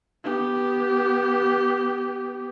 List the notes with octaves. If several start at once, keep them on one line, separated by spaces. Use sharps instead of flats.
B3 G4